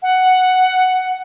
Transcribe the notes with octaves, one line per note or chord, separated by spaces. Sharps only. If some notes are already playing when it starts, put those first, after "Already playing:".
F#5